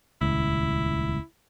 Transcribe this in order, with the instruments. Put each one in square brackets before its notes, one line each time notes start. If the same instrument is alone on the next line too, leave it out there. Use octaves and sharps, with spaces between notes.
[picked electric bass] D#1 C#2 [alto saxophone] E4